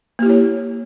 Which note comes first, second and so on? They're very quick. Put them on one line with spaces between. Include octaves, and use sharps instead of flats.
A#3 G4 E4 C#5